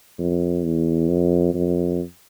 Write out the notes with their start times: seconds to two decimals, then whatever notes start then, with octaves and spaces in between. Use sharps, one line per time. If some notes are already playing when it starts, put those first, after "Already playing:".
0.19 F2
0.64 E2
1.08 F2
1.54 F2